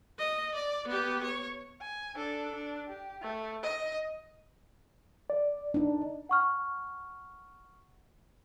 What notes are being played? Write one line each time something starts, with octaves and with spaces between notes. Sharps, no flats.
D#5
D5
B3 G4
C#5
G#5
D4 A4
D4
G4
A3
D#5
D5
D4 D#4
F#5 C#6 F6